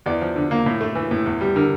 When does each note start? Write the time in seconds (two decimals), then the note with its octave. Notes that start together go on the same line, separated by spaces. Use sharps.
0.06 E2 D5
0.21 F3
0.36 D3
0.51 A#3
0.66 A2
0.81 A3
0.95 E3
1.11 A2
1.26 E2
1.41 G3
1.56 D3 A#4